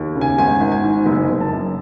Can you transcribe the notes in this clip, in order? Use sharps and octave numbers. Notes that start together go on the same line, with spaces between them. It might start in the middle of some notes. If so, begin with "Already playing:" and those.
Already playing: D#2
C#3
G#5
G#1 G#5
G#1
G#5
G#2
F#1
F#1
A5
F#2